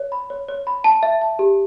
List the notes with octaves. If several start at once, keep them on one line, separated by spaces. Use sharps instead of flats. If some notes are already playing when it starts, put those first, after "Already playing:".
Already playing: C#5
B5
C#5
C#5
B5
A5
E5
A5
G4